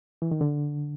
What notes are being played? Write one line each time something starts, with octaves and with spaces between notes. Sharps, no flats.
E3
D#3
D3